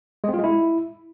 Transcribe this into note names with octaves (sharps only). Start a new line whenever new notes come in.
G#3
C4
F4
G#3
E4